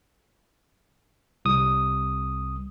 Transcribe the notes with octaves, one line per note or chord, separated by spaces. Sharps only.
C2 D#6